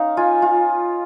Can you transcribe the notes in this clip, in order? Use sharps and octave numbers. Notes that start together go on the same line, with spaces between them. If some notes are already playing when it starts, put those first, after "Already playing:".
Already playing: C#4 D#4 F5
F4 G#5
F4